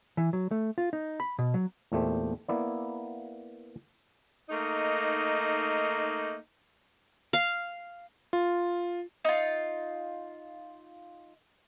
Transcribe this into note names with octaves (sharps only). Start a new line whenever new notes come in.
E3
F#3
A3
F4
D#4
B5
B2
F#3
E2 A#2 A3 G4 C5
A#3 B3 E4 D5
A3 A#3 D#4
F5
F4
D#4 F4